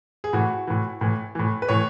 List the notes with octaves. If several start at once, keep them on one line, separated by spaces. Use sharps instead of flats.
G#4
A2 E3 F#4
A2 E3
A2 E3
A2 E3
B4
A2 E3 C#5